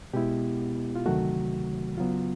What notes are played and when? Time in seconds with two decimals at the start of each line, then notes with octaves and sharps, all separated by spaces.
0.14 B2 G#3 B3 E4 G4
0.96 F4
1.06 D2 C3 D#3 F#3 A3 F#4
1.98 C#3 F#3 B3 F4